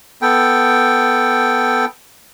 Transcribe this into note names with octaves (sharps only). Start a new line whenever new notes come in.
B3 A4 G5